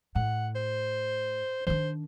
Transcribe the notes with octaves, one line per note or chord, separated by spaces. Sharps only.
A2 F#5
C5
D#3 D4 C5